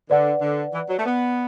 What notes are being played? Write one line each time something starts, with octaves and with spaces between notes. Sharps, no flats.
D3 B4 D5 F#5
D3
E3
F#3
A3
B3